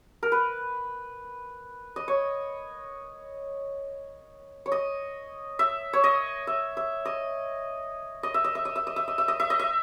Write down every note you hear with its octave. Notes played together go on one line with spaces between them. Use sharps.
A#4
B4
D#5
C#5
C#5
D#5
E5
C#5
D#5
E5
E5
D#5
D#5
E5
D#5
E5
D#5
E5
D#5
E5
D#5
E5
D#5
E5
D#5
E5